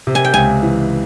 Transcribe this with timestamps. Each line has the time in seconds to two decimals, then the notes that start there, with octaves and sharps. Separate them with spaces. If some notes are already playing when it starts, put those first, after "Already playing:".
0.07 C3
0.15 G#5
0.24 G5
0.34 C#2 G#5
0.62 E3